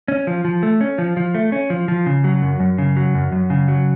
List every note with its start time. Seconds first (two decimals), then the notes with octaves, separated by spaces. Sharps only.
0.08 C#4
0.27 F3
0.45 F3
0.63 A3
0.81 C#4
0.98 F3
1.17 F3
1.34 A3
1.52 C#4
1.70 F3
1.88 F3
2.06 C#3
2.24 F#3
2.42 F#2
2.60 F#2
2.78 C#3
2.97 F#3
3.15 F#2
3.32 F#2
3.50 C#3
3.68 F#3